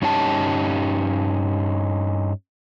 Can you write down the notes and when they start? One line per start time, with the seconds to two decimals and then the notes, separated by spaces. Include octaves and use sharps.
0.02 G2 C#4 D#4 G4 G#5 A5